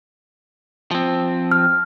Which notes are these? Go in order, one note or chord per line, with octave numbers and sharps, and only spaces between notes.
F3 C4
F6